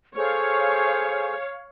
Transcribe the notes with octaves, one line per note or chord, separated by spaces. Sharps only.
G#4 A4 C5 C#5 F5